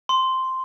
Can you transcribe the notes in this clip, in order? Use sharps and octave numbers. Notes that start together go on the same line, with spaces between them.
C6